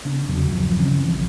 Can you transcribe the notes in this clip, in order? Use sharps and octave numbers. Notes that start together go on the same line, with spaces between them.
C#3 B3 D4
E2 C#3 F#3
D#1 G2 F3 F#3
C#3 E3 C4 C#4
A#1 D#3 F3